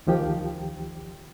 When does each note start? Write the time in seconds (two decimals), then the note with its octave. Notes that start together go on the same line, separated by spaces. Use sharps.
0.07 D2 D#3 F3 G4 G5